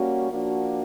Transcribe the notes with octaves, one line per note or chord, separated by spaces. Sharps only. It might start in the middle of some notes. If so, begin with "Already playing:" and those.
Already playing: G3 A#3 C#4 F#4
F3 A#3 D4 F#4